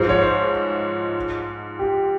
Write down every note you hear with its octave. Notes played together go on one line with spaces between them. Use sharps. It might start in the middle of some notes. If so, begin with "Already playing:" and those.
Already playing: G#2 F3 G#3 C5
C#5
C5
G4